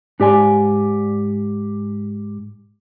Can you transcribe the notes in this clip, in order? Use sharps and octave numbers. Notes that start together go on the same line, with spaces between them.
G#2 G4 D5 G#5 C6